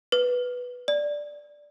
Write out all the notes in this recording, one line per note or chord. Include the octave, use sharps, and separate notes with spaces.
B4
D5